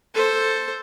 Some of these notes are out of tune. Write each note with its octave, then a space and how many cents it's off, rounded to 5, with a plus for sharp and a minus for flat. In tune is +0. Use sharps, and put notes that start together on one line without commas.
A4 +0 C5 +0